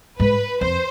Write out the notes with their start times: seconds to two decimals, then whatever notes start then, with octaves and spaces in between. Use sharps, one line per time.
0.20 G#2 B4
0.61 F2 C5